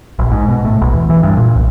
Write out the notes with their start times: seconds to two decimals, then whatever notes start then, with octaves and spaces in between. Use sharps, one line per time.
0.19 A#1
0.32 G#2
0.48 B2
0.65 A2
0.81 B1
0.93 E2
1.10 E3
1.23 G2
1.37 A#2
1.55 B1